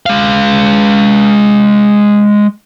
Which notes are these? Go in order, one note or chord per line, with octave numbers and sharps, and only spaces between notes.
G#3 F5